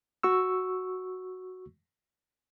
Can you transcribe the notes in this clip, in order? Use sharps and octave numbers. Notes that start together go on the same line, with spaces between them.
F#4 C#6 E6